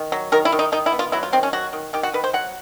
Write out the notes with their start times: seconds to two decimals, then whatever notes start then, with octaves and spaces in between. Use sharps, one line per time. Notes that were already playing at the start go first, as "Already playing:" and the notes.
Already playing: D#3
0.12 F#3
0.32 D#3 A#4
0.45 E4
0.52 D#3
0.59 D#4
0.72 D#3 D#4
0.86 E4
0.93 B3
0.99 F4
1.12 F#3 E4
1.23 F4
1.33 D#3 C4
1.43 C#4
1.53 F#3 F#4
1.73 D#3
1.93 D#3 G4
2.03 F#4
2.13 D#3 B4
2.24 C5
2.33 F#3 F#5